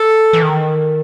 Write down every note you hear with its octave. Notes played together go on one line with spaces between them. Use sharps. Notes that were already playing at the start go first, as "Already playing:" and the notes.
Already playing: A4
E3
D#3